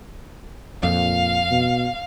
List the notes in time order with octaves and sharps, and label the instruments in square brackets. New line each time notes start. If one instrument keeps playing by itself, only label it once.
[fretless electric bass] F2 [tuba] A#2 [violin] F5
[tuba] B2